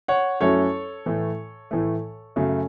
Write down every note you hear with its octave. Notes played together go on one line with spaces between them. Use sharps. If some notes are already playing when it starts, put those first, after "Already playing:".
C#5 F#5
F#2 F#3 A3 C#4 E4 A4 C#5
A2 E3 A3
A2 E3 A3
F#2 C#3 F#3 A3